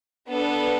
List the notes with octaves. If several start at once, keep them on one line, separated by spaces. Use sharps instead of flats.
B3 D4 A4